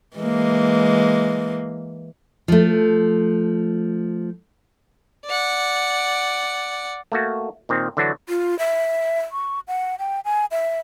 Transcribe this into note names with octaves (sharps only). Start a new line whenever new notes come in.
E3 G#3 A#3
F3 A3
D5 F#5
A3 A#3 F#4
A#2 D#3 C4
D3 E3 F#3 D4 F#4
F4
E5
C#6
F#5
G5
G#5
E5